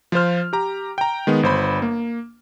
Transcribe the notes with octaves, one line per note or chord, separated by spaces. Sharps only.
F3 F4 C5 F6
G4 A#5
G5 A#5
D#3 G#3 B3
G1 C5 B5
A#3